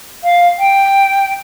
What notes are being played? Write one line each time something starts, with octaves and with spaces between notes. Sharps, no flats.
F5
G5